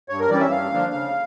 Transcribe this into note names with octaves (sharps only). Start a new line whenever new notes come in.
G2 C#5
A#4
E3 G3 C#4 D5
E5
G2 F5
D3 F3 A#3 D4
C#3